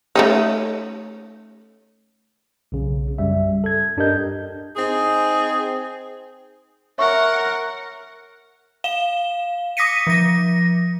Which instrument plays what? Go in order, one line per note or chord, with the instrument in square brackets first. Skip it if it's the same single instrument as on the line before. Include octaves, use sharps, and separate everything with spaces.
[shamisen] A3 C#4 D#4
[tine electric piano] B1 C#3
F#2 G3 E5
A4 G#6
G2 D4 G4 A#4 D#5 G6
[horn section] C4 D#4 G#4
[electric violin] A#4 F#5 [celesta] C#5 E5 C#6
[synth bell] F5 E7 G7
D6 D#6 A#6 B6 C#7 D#7
F3 A#6